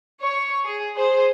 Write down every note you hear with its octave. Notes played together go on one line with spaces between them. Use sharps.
C#5 C#6
G#4
G#4 C5